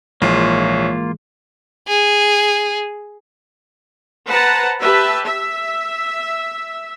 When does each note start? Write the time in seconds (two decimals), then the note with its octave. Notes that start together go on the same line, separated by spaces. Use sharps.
0.22 A#1 G#2 E3 G#3 A#3 F4 C#5
1.88 G#4
4.27 B4 C5 F#5 A5 A#5
4.81 G4 B4 E5 A5
5.25 E5